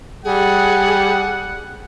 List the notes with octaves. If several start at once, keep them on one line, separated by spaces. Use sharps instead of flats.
G3 G#4 F#5